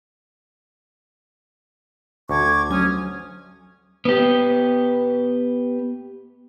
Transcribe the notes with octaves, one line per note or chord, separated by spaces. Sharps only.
D2 C#6 D6 G#6
F#3 C#4 D#6 F6 G#6
B3 G4